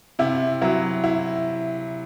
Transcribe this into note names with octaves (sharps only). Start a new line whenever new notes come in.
C3 E4
F#3 E4
E4